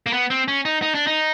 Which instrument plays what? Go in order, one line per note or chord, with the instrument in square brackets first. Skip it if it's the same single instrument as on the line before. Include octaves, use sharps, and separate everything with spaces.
[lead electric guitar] A#3
B3
C4
C#4
D#4
D#4
D4
D#4